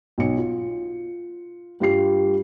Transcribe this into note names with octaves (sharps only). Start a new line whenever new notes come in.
B1 C#7
F4
G2 G3 F4 C7